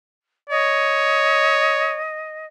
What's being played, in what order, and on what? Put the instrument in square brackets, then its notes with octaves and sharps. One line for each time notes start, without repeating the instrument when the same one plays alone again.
[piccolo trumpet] C#5 [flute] D#5